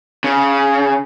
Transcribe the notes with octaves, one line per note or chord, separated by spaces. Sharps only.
C#3